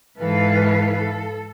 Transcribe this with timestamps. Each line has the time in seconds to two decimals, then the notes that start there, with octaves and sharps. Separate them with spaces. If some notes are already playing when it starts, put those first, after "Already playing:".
0.17 G#2 E3 A4 B4 F5
0.93 A4